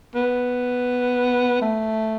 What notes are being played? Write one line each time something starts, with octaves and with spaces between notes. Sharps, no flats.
B3
A3